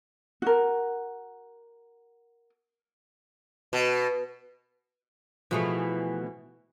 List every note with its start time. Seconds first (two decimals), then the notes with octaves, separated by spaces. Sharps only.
0.42 F#4 A#4
3.73 B2
5.51 B2 E3 F3 A3 G#4